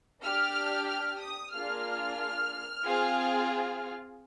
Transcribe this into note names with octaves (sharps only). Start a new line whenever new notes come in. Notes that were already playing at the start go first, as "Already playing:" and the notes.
D4 G4 F6
F6
D#6
A#3 D4 F4 G#4 F6
C4 F4 G#4